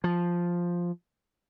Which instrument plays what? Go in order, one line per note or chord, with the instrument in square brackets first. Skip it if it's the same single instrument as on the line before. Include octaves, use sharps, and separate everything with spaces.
[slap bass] F3